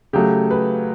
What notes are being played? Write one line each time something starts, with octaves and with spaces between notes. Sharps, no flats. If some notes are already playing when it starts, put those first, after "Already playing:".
C#3 F#3 A3 G4
B4